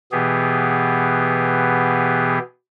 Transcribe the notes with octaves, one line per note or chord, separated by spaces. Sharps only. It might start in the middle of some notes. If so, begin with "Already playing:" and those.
B2 E3 B3 G4 G#4